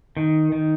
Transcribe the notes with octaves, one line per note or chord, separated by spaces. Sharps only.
D#3
D#3